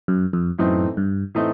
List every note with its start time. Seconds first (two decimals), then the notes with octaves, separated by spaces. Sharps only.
0.08 F#2
0.33 F2
0.58 F#2 A2 E3 A3 C4 D#4
0.97 G2
1.35 A2 E3 A3 C4 D#4